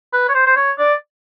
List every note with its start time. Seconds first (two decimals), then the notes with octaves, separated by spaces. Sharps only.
0.13 B4
0.29 C#5
0.34 C5
0.47 C5
0.56 C#5
0.78 D5